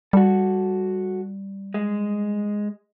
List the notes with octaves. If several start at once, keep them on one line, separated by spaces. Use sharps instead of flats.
G3 F#4 A4
G#3